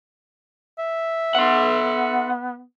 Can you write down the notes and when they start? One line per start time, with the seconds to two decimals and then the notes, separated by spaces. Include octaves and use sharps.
0.79 E5
1.35 B3 F#5 C6